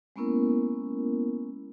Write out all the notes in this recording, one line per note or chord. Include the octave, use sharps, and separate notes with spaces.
G#3 A#3 B3 C#4 E4 A#4